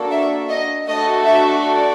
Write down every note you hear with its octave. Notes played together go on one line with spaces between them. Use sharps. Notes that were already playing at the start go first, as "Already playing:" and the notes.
Already playing: A#3 D4 F#4 A4
E5
D#5
A3 D4 F#4 A4 D#5
E5
D5